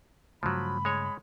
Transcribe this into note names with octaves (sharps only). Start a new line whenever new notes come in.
G2 C#3 F3 F#3 A3 B5
G#3 C#5